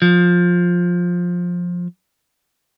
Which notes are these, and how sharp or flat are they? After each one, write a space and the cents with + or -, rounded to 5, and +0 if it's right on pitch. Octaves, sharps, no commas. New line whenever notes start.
F3 +15